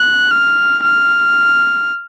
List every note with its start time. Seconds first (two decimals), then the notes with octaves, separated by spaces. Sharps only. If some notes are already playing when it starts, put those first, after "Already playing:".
Already playing: F#6
0.31 F6
0.83 F6